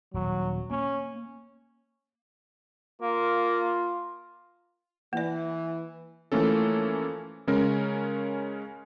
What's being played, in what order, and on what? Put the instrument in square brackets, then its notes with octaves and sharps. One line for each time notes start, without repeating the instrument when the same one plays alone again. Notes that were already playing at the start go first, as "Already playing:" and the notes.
[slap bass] D#1 [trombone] F#3
[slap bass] A#3 [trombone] C#4
[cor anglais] A#3 [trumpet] F4
[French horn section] E3 [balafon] A#3 D5
[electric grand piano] E3 F3 A3 A#3 C#4 A4
C#3 G#3 C#4 A#4